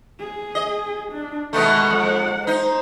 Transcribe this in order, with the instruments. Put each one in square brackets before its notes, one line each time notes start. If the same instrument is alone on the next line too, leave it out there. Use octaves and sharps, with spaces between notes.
[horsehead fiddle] G#4
[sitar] D#5
[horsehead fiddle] D4
[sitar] B2 D#3 A3 [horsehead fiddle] G#3 F#5
[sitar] F2
[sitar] D#4 [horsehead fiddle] C5